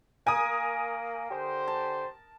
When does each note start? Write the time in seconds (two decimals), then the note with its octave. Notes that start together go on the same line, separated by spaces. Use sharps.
0.27 A#3 A#4 G#5 D#6
1.30 D3 G4 C5
1.68 A5